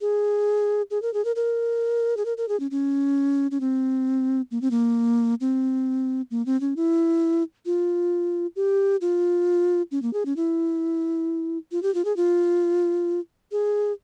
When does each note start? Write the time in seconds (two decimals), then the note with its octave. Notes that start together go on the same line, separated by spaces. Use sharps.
0.01 G#4
0.91 G#4
1.02 A#4
1.14 G#4
1.25 A#4
1.36 A#4
2.17 G#4
2.25 A#4
2.37 A#4
2.49 G#4
2.60 C#4
2.71 C#4
3.51 C#4
3.60 C4
4.51 A#3
4.61 C4
4.71 A#3
5.41 C4
6.31 A#3
6.46 C4
6.61 C#4
6.76 E4
7.66 F4
8.56 G4
9.01 F4
9.91 C#4
10.02 A#3
10.13 G#4
10.26 C#4
10.36 E4
11.72 F4
11.83 G4
11.95 F4
12.05 G#4
12.17 F4
13.52 G#4